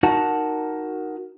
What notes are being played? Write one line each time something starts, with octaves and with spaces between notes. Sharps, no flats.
D#4 F#4 A#4 F#5 A5